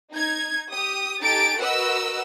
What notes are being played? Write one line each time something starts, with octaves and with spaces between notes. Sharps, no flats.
D#4 G#6
G4 D#6
D#4 G4 A4 G#5 A6 D7
F#4 A#4 B4 D#5 F#5 E6